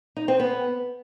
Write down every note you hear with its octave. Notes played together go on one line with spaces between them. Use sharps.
D#4
C4
B3